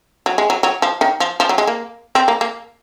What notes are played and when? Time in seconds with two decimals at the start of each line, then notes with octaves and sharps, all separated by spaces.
0.26 F#3
0.38 G#3
0.50 F#3
0.63 F#3
0.82 F3
1.01 D#3
1.20 F3
1.40 F3
1.49 F#3
1.58 G#3
1.67 A#3
2.15 C4
2.28 A#3
2.41 A#3